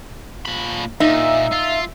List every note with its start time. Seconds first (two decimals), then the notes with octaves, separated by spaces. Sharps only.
0.45 A#2 B5
1.00 A#2 D#4 E5
1.52 F4